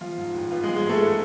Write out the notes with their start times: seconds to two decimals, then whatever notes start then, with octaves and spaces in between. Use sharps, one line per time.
0.01 F3 F4
0.18 G#2
0.34 A1
0.51 B3 F4
0.64 G#3 G#4
0.68 F3
0.76 G#3 G#4
0.85 G#2 A3 A4
1.02 B3